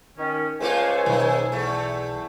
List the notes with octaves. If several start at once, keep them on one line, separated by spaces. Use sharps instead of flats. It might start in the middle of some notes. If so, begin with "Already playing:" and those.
D#3 C#4
C#2 A3 A#3 F4 C5 G#5
B1 D#3
E2 A3